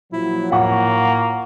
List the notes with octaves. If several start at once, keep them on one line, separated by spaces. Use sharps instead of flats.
A#2 F3 F#3 E4
A2 A#3 F4 F#5 C#6